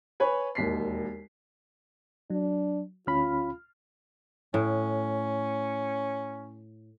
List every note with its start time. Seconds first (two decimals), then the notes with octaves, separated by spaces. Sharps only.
0.20 B4 C#5 G#5 B5
0.55 E1 D#2 B6 C7
2.30 F#3 D4
3.07 D2 C#4 F4 B5 F6
4.54 A2 C#4